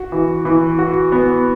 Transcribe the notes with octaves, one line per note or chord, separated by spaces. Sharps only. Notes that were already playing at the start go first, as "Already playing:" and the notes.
Already playing: F#4
E3
E3
F#4
B3